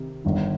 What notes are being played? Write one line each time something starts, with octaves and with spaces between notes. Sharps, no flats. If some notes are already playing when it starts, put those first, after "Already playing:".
Already playing: C3 D#3
G1 G2 D#3